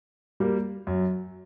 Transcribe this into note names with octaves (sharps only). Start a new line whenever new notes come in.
G3 A#3
F#2